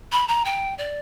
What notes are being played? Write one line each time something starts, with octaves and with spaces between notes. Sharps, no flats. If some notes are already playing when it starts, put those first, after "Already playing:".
B5
A#5
G5
D5